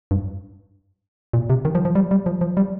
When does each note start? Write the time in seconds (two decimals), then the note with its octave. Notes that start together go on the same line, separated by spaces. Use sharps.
0.11 G2
1.33 A#2
1.50 C3
1.65 D#3
1.75 F3
1.85 F3
1.95 G3
2.11 G3
2.26 F3
2.41 F3
2.57 G3